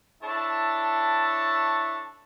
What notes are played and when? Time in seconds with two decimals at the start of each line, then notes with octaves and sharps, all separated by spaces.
0.23 D4 E4 A4 C#5 A5